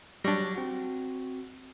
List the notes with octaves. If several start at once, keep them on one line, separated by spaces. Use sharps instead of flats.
F#3 G3 D4 C#6 A#6
C4 F#4